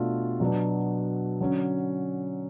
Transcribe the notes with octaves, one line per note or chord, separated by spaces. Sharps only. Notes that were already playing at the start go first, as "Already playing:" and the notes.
Already playing: B2 A3 D4 F4
B2 F#3 B3 D4
D3 F#3 C#4